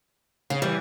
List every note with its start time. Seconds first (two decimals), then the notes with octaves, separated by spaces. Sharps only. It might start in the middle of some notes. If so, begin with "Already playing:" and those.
0.50 C#3 F5
0.62 E3 G3